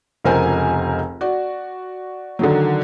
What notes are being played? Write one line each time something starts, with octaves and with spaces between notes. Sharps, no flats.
F1 C#2 A#4 C5 G#5
F#4 D5
D3 D#3 F#3